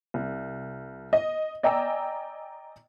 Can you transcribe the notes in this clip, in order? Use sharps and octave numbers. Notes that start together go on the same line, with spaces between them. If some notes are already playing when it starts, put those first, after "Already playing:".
C2
D#5
D5 D#5 G5 G#5 A#5 E6